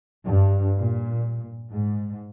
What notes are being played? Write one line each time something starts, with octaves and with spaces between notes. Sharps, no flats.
G2
A#2
G#2